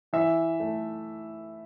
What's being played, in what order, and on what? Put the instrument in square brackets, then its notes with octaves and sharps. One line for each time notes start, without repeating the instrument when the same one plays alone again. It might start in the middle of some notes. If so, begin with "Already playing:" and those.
[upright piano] E3 E5
A3